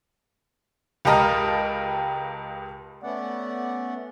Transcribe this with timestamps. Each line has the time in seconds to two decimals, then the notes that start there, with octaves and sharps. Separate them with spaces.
1.05 C#2 G4 A#4 D#5 A5 F6
3.03 A3 B3 C#4 D5 F#5